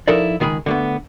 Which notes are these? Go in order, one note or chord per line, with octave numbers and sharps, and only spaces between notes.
F3 D#4 E4 A4 A#4 D5
C#2 D#3 G#3 G#4 B5
D3 A3 B3